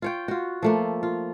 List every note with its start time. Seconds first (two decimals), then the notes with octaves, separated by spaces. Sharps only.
0.02 F4 C#5 G5
0.28 F4 F#4
0.63 F3 A3 A#3
1.03 F4